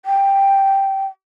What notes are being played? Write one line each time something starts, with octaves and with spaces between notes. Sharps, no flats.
G5